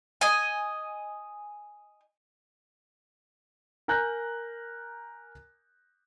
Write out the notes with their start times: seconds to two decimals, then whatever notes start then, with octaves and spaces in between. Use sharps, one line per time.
0.21 D#5 G#5
3.88 A#4 G#5 A#5 F#6 G6 A#6